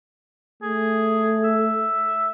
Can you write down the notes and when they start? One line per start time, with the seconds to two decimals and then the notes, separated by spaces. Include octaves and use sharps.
0.63 A3 G#4
1.44 E5